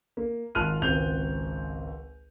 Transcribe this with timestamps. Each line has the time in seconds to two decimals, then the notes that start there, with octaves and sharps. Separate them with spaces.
0.17 A#3
0.55 G#1 F4 A5 F6 F#6 D#7
0.82 G#1 C#2 C4 G6 F7